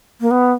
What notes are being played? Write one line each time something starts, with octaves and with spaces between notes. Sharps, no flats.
A#3
B3